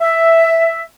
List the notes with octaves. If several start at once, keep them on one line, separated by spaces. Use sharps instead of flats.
E5